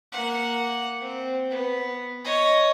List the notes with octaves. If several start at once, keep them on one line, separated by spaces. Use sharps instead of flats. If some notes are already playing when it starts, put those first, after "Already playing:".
A#3 F#5
C4
B3
C#5 D#5